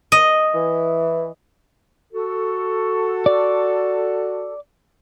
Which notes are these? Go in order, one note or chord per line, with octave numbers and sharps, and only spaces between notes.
D#5
E3
F#4 A4
D5